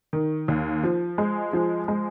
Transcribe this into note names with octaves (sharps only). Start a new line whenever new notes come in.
D#3
D#2
F3
G#3
F3
G#3